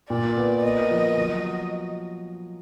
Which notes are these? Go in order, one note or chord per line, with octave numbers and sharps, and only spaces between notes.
A#2 D5
B3
A#3 D#5
F3
F#3